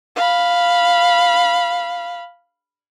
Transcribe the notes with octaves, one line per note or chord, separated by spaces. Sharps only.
F5 B5